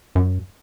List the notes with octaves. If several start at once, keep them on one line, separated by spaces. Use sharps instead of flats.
F#2